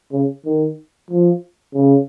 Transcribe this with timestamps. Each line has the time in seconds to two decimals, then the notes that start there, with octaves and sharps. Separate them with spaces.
0.12 C#3
0.46 D#3
1.11 F3
1.74 C#3